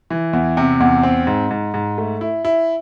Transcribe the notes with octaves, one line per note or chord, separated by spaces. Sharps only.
E3
E2
C3
E2
C4
G#2
G#2
G#2
A3
E4
E4